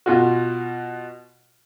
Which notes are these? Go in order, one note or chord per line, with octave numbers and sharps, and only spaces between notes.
B2 F4 F#4